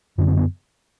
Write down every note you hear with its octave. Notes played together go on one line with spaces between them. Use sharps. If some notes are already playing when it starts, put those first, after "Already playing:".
F#2 D3 D4
C4
B3